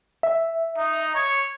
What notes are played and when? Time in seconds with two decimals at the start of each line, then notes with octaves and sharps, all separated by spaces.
0.23 E5
0.78 D#4
1.15 C#5